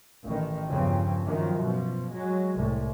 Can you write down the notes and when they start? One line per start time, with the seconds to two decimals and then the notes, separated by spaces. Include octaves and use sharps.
0.24 A1 D#3
0.69 E2 G2 C#3 F3 C4
1.25 F#2 D#3 F3
1.61 B2 F3
2.11 F#3 G#3
2.57 C2 A2